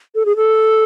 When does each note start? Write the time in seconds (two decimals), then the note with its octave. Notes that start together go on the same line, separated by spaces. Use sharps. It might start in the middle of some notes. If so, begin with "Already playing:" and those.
0.15 A4
0.25 G#4
0.36 A4